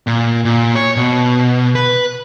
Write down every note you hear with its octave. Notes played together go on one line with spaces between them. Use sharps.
A#2
A#2
C#5
B2
B4